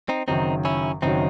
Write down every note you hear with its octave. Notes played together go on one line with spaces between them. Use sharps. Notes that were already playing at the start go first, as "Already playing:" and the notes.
C4 D#4
F#1 F#2 D#3 F#3 C4 D#4
C#4 E4
F#1 F#2 D#3 F#3 C4 D#4